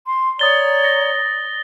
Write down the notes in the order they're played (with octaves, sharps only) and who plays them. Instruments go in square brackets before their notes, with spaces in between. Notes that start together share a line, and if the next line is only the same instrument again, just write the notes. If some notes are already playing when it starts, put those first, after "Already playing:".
[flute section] C6
[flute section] C#5 D5 A#5 [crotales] D#6 A6 G7
[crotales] A#6